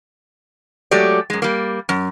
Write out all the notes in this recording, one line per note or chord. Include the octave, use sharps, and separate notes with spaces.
F#3 G#3 A3 G4 D5
F#2 G#3
G3 A#3
F#2